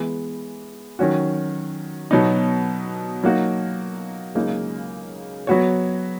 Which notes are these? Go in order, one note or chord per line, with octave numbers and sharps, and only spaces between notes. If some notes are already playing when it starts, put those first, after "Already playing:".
Already playing: E3 G#3 B3
D#3 F#3 C#4 F#4
B2 F#3 B3 D#4
F#3 A#3 D#4 F#4
C#2 C#3 F#3 A#3 D#4
F#3 B3 F#4 C#5